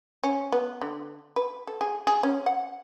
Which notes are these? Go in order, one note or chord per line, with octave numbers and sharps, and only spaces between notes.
C#4
B3
D3
B4
A4
G#4
G#4
C#4
F#5